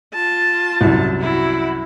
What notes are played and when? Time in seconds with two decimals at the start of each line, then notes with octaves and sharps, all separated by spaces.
0.14 F4 A5
0.81 C2 F#2
1.21 E4 F#4